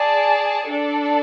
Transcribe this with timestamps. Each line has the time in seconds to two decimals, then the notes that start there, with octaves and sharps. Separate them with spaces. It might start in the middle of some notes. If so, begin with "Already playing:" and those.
Already playing: G#4 D5 A5
0.70 D4 A4 D5